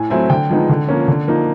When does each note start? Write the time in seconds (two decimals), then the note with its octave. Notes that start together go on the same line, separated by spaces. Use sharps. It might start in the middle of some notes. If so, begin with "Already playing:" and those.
Already playing: A2 G#5
0.10 F#3 A3 C4 E4 G#5
0.30 D3 G5
0.49 F3 G#3 B3 D#4
0.69 D3
0.88 F3 A#3 C#4
1.08 D3
1.27 F3 A#3 D#4